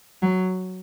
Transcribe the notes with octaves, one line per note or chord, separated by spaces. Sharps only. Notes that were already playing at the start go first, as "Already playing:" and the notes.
F#3